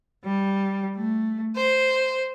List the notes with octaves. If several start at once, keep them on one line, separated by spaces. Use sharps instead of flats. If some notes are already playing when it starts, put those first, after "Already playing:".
G3
A3
C5